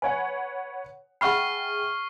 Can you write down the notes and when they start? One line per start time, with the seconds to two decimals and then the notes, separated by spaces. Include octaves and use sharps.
0.02 B4 C#5 F#5 G#5
1.21 G#4 E5 F#5 G5 B5 C#6 F6 C7